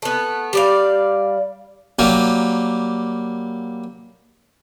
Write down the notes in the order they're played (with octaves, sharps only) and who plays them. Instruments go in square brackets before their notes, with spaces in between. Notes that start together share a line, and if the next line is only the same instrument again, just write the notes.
[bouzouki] A3 B3
G3 D5 F5
[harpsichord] F#3 G3 A#3